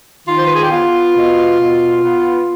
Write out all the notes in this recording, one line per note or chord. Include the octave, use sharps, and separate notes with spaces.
D#3 F4
C5
B4
G#4
G4
B3 F4
B2
B2
B3